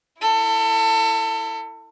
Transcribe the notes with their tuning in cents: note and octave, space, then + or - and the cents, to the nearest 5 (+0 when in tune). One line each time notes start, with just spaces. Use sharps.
E4 +0 A4 +30